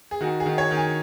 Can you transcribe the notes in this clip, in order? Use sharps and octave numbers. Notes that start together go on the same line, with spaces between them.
G#4
D#3 F#4
G#4
D#3
C#5
D#3
G#5